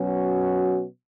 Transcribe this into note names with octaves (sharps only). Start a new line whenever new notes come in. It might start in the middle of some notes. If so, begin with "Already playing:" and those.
Already playing: B2 F#3 C#4 F#4